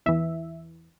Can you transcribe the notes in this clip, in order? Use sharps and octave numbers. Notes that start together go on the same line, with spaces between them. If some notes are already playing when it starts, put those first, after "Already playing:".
E2 E3 E5